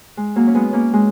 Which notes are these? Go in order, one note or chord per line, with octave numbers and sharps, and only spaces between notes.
G#3
F#3 A#3
C#4
G#3 B3
A#3 C#4
G#3